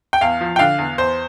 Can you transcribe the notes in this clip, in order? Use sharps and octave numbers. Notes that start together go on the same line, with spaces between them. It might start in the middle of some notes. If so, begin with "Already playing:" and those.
G5
E2 F5
F3
G5
D3 F5
E2
E2 C5